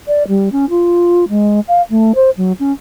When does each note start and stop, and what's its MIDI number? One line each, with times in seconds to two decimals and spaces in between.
0.07 0.23 74
0.28 0.52 55
0.52 0.65 61
0.70 1.29 65
1.29 1.60 56
1.68 1.82 77
1.90 2.12 57
2.15 2.30 72
2.37 2.52 54
2.59 2.72 61